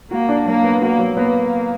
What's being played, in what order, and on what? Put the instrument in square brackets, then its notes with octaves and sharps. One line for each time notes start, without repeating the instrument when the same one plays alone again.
[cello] A#3 [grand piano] F#4
[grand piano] D4
[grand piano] F#3 [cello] A#3
[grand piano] B3
[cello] A#3 [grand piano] F#4
[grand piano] F#3
[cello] A#3 [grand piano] B3